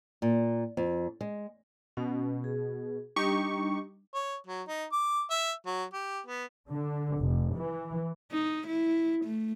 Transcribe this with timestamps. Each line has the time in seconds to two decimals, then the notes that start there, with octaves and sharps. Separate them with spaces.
0.22 A#2
0.77 F2
1.21 G#3
1.97 B2 C#4
2.44 G#4
3.16 G3 D4 D#4 G4 C#6
4.14 C#5
4.47 F#3
4.68 D#4
4.92 D6
5.30 E5
5.66 F#3
5.93 G4
6.26 B3
6.68 D3
7.17 F1
7.54 E3
8.32 D#4
8.67 E4
9.25 A3